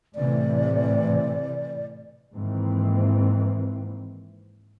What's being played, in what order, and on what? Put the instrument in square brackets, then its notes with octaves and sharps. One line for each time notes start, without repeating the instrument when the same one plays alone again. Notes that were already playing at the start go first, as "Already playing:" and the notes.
[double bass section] A2 C3 E3 [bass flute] D5
[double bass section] G#2 D#3 E3 A#3 C4